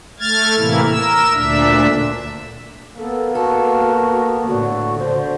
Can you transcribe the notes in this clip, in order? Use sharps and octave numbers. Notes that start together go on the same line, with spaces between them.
A3 F6 G#6 A6
A2 C3 E3 A3 A#3 E4
A#4 E6
D2 A#2 D4 E5
A#3 B3 A4
F#4 A4
A2 D3 F#4
D3 C5